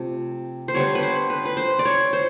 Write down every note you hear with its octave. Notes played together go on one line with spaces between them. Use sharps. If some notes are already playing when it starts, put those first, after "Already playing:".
Already playing: C3 F3 A3
C5
D3 G3 B3 C#5
B4
C5
B4
B4
C5
D5
C#5
C5